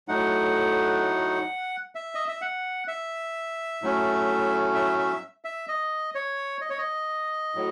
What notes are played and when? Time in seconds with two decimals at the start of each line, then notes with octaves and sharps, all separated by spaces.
0.08 A2 F#3 A3 D#4 F#5
1.95 E5
2.15 D#5
2.28 E5
2.41 F#5
2.88 E5
3.82 A2 F#3 A3 C#4
4.75 E5
4.98 E5
5.45 E5
5.68 D#5
6.15 C#5
6.61 D#5
6.70 C#5
6.78 D#5
7.55 A2 F#3